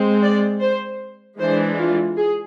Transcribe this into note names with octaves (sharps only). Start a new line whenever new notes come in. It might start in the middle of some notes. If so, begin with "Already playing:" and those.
Already playing: G#3 C4
D5
C5
E3 G#3 D4 C5
F4
G#4